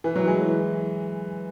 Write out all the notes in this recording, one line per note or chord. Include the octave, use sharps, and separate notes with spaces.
E3
F#3
E3 G#3